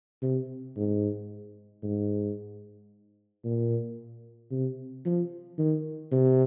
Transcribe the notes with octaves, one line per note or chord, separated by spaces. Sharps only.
C3
G#2
G#2
A#2
C3
F3
D#3
C3